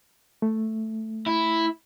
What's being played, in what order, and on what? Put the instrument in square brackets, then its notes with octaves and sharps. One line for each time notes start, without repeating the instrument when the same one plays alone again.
[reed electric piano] A3
[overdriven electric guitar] E4